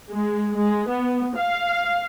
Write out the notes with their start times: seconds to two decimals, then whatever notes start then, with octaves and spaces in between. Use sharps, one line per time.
0.11 G#3
0.55 G#3
0.86 B3
1.35 F5